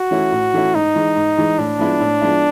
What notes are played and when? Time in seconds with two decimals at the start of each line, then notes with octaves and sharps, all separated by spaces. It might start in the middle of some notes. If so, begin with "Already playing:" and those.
Already playing: F#4
0.11 E3 A3 C#4 E4
0.32 A2
0.54 E3 A3 C#4 E4
0.75 G#2 D#4
0.96 E3 G#3
1.16 G#2
1.37 E3 G#3
1.58 A2 D4
1.79 F3 G#3 B3 E4
2.00 A2
2.21 F3 G#3 B3 E4